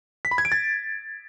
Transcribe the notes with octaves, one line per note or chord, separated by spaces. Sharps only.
B6
B5
G#6
D7
A6